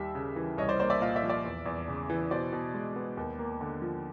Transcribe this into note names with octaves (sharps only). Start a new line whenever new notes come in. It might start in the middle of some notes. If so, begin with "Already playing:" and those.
Already playing: D#2 G3 E5
C#3
E3
C2 C#5 D#5
C5 D5
A#3 C5 D5
D5 E5
A#2 D#5 F5
D5 E5
F3
D5 E5
E2
E2
C#3
E3
B2 C5 D5
B2
G#3
B3
D#2
A#3
D3
F3